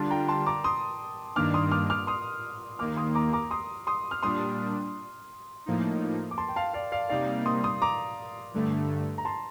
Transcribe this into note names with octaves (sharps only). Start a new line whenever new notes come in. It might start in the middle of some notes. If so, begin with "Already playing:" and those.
Already playing: D3 G3 D4 F4 A5 C6
G5 A#5
A5 C6
A#5 D6
C6 D#6
G2 D#3 A#3 D4 D6 F6
C6 D#6
D6 F6
D6 F6
C6 D#6
D#2 D#3 A#3 D6 F6
C6 D#6
A#5 D6
A#5 D6
C6 D#6
C6 D#6
F6
A#2 G3 D4 C6 D#6
A2 F3 A#3 D#4
D6
A5 C6
G5
F5 A5
D5 F5
D5 F5
C3 G3 A#3 D#4 D5 F5
C6 D#6
C6 D#6
A#5 D6
G2 D3 A3
A#5
A5 C6